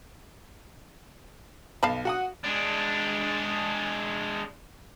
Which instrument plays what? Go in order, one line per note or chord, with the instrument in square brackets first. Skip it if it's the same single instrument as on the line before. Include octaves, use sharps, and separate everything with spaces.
[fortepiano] B1 [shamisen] F5 A5 B5
[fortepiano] F#4 F#5 D#6
[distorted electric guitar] G#3 D4